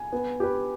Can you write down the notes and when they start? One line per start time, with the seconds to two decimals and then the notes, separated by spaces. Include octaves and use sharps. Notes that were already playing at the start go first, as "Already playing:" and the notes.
Already playing: G#5
0.13 B3
0.40 G4 B4